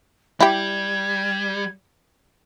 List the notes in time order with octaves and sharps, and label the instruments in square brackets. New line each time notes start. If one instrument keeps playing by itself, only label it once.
[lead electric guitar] G3 [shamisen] E4 G4 [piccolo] G#6